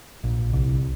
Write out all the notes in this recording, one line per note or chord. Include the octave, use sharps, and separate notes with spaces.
A#1
C2